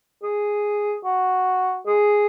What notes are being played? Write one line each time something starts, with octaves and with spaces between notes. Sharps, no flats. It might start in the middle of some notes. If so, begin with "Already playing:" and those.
G#4
F#4
G#4